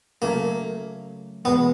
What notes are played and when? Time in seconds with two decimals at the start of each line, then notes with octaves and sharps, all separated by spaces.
0.22 C#3 F#3 A3 A#3
1.45 E2 B2 G#3 B3